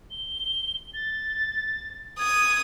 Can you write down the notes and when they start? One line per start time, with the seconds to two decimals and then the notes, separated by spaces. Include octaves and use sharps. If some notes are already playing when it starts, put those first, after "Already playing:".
0.11 G7
0.94 A6
2.19 D#6 G#6